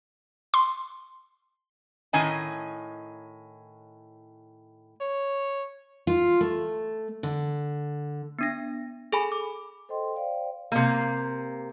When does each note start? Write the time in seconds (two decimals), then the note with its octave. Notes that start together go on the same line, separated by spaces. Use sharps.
0.54 C6
2.13 A2 D#3 C#4 D#5 G#5
5.01 C#5
6.07 F4
6.41 A3
7.23 D3
8.39 B3 D4 A#6
9.12 G#4 A4 G#5 B5
9.32 D6
9.89 A4 C5 D#5 G5 C6
10.14 C5 D5 F5 G5
10.72 C3 A#3